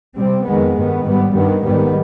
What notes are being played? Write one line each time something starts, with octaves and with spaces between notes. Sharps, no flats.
C3 G3 C4
F2 D#3 G#3 B3
G2 D#3 B3
G#2 G3 B3
G2 D#3 B3
G#2 D#3 G3 B3